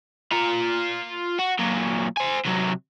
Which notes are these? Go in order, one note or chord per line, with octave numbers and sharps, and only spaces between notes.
F4 A#5
F#4
A#2 F#3
C5 G#5
C3 F#3